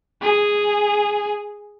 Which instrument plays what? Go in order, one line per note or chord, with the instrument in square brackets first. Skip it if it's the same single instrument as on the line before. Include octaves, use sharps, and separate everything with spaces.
[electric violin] G#4